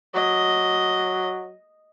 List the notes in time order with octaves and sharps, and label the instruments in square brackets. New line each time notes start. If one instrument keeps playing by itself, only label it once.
[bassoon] F#3 [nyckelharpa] D#5